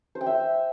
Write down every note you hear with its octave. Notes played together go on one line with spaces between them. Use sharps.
C5
G5
E5